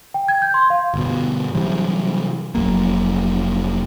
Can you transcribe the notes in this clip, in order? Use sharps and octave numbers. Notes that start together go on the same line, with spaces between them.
G5
G#6
G6
C6
F5
G1 B2
C3 E3 F#3 G3
F1 E2 F#3 A#3